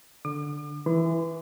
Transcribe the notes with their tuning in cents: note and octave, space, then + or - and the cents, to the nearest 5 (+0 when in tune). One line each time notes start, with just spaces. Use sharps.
D3 +0 D6 +45
E3 +0 C6 -40